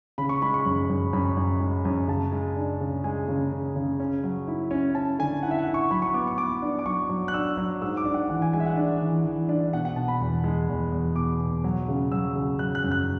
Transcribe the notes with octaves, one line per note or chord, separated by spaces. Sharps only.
C#3 B5
C#6
G#3 B5
C#6
F#2
F#2
F#2 B5
F#2
G#3
F#2
C#3 A5
G#3
D4
C#3
G#3 G#5
C#3
C#3
C#3
C#4
F#3
E4
C#4
C#4 A5
D3 G#5
E4 F#5
E5
F#5
E4
C#6
F#3 B5
C#6
B3 D6
C#6
B3 D6
D4
D6
F#3 C#6
F#3
F#6
D4 E6
F#3
G#2 E6
D6
D4
F#5
E3 F#5
G#5
G#3 G#5
E5
F#5
D4
E3
E3
D4
B2 F#5
F#5
B2 A5
B5
E2
G#3
E2
E2
B2 D6
B2
F#3
C#3
F#3 E6
C#3
F#3 F#6
F#6
F#2
F#6